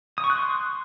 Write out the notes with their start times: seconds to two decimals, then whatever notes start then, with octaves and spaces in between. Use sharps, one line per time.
0.18 D#6
0.24 C#6
0.30 F#6
0.36 C6